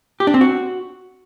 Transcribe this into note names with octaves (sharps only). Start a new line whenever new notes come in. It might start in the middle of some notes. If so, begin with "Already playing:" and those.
G4
D4
C4
F#4